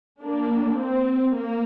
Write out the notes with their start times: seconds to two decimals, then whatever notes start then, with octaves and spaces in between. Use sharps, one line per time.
0.21 A#3 D4
0.78 C4
1.35 A#3